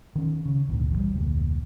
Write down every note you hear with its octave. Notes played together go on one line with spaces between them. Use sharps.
D#3 C#4
C#3
G#1 D2 A#2 D3
E3 F3 G3
F1 D2 A#2